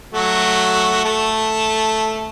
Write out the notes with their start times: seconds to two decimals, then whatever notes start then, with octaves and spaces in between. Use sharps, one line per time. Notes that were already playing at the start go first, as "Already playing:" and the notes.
0.13 F#3 A3 F#4
1.05 A3 A5